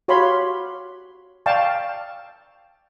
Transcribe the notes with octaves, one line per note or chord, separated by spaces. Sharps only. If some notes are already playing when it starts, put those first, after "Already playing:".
F#4 G4 C#5 F5 B5 C6
D5 F5 G5 A5 C#6